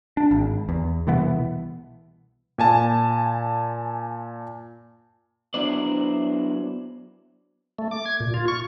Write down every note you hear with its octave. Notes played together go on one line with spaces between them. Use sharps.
D4
G#1
E2
C2 B2 E3 B3
A#2 G#5 A5
F#3 B3 D4 E4 C5 D5
A3
D6
G#6
A#2
F4
C#6